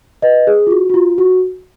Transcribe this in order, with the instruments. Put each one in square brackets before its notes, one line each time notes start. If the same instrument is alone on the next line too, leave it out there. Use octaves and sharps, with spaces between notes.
[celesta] B4 D#5
G#4
F4
F#4
F#4
F4
F#4